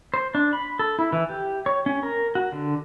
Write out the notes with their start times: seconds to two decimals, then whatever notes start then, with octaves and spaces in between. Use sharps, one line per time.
0.14 C5
0.35 D4
0.53 B5
0.79 A4
0.99 E4
1.13 E3
1.29 G4
1.66 C#5
1.86 C#4
2.03 A#4
2.35 F#4
2.52 D3